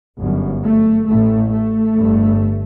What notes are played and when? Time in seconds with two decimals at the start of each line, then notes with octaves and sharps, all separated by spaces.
0.17 G1 F#2
0.62 A3
1.07 A1 A2 A3
1.53 A3
1.99 G1 G2